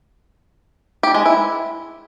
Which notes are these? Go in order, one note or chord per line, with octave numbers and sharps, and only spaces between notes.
G4
G#3
E4